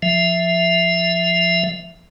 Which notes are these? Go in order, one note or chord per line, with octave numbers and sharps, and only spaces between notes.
F3 E5